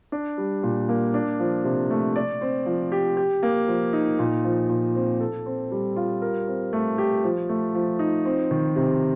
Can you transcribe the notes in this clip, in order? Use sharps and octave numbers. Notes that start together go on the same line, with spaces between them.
D4
G3
A#2
A#3
D4
F3
C3
A3
D5
C4
F3
G4
G4
A#3
F3
D#4
A#2
F3
A#2
C4
A4
C4
G3
F4
A#4
C4
A3
G4
F3
A3
F3
D#4
C4
D#3
C3